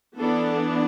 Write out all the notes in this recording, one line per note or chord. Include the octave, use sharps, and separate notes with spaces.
E3 B3 D4 A4